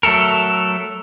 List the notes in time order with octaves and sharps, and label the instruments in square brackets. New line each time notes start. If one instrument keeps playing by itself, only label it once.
[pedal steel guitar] F#3 A3 A4 A#4